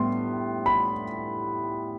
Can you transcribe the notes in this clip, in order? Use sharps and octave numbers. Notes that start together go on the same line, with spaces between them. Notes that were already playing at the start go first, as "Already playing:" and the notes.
Already playing: A2 G3 B3 C6
B5